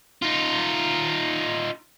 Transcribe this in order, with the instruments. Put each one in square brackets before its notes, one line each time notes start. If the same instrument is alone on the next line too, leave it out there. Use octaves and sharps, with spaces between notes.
[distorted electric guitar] D#4 F4